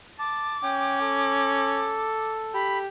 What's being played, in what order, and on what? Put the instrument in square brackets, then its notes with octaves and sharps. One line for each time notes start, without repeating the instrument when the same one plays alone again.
[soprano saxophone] A5 [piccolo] D6
[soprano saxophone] C#4 [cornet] G5
[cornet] A4
[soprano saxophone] G4 [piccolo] B5